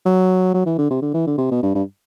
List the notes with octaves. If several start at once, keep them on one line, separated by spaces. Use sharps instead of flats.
F#3
F#3
E3
D3
C3
D3
E3
D3
C3
B2
G2
G2